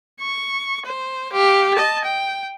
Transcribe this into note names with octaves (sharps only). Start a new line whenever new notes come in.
C#6
C5
G4 F5
D#5 A5
G5